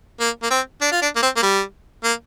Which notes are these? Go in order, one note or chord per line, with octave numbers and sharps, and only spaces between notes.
A#3
A#3
C4
D4
F4
D4
A#3
C4
A#3
G3
A#3